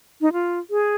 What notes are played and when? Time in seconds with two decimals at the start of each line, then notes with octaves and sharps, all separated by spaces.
0.21 D#4
0.33 F4
0.70 G#4